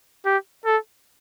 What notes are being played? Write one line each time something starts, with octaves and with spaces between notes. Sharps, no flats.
G4
A4